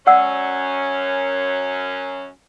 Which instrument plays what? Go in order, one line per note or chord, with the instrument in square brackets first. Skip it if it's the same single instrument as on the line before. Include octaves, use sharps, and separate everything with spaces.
[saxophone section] F#2 C#4 [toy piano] D5 F#5 E6